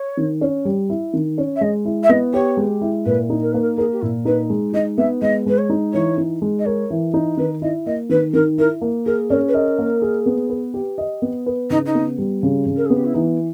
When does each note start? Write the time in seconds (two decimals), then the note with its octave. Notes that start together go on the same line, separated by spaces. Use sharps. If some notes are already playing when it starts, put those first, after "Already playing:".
Already playing: C#5
0.17 D#3
0.41 C#4
0.65 G3
0.89 E4
1.14 D#3
1.38 C#4
1.56 E5
1.61 G#3 D#5
1.85 E4
2.03 E5
2.09 B3 D#5
2.33 G4 C#5
2.57 G#3
2.81 E4
3.06 A#2 B4
3.30 D#4
3.42 A#4
3.52 A#3 B4
3.62 A#4
3.78 G#4 A#4
3.92 G4
4.02 A#2 E4
4.25 D#4 B4
4.50 G#3
4.73 D#4 D#5
4.98 B3 E5
5.22 G#3 D#5
5.46 G#3 B4
5.58 C#5
5.70 D#4
5.93 E3 C#5
6.18 D#4
6.42 G#3
6.59 D#5
6.66 A#4 C#5
6.90 E3
7.14 D#4
7.37 D#3 B4
7.62 E4 D#5
7.86 A#3 D#5
8.09 D#3 B4
8.34 D#3 A#4
8.58 E4 A#4
8.81 A#3
9.05 G#4 A#4
9.30 C#4 A#4
9.48 B4
9.54 A#4 D#5
9.79 A#3
10.02 G#4
10.26 B3
10.50 B4
10.74 G4
10.98 D#5
11.22 B3
11.46 B4
11.70 C#3 D#4
11.86 D#4
11.95 B3
12.18 G3
12.43 C#3
12.66 C#3
12.76 A#4
12.86 G#4
12.90 B3
12.96 G4
13.05 E4
13.14 E3 D#4